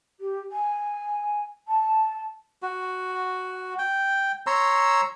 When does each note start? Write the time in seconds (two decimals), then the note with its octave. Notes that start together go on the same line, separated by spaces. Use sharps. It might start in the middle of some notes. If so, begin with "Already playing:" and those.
0.20 G4
0.51 G#5
1.68 A5
2.62 F#4
3.79 G5
4.47 C#5 A#5 C6 E6